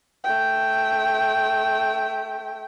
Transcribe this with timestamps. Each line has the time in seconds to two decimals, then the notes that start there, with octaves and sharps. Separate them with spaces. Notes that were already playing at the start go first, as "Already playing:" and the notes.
0.24 A3 G5